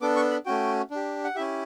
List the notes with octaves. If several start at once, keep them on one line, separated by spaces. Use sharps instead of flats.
B3 D4 A4 D6
C#6
B5
A3 C#4 F#4 G5
D4 G4
F#5
C#4 E4 G4 E5